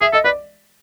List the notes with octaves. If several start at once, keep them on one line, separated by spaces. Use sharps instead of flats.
G#4 E5
A4 D#5
B4 D5